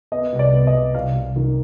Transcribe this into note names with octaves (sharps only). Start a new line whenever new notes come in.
B3 D#5
C2
D5
B3
D#5
C2
C2 F5
C2
D#3